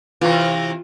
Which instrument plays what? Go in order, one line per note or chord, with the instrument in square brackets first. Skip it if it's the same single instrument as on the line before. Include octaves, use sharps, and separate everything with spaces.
[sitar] C3 E3 [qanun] F4